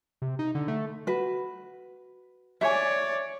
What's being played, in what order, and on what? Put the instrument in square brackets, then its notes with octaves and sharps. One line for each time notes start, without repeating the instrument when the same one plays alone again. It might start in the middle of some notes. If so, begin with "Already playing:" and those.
[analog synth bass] C3
D#4
D3
A3
[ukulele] F#4 B4
[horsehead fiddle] C#5 D5 [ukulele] E5 G#5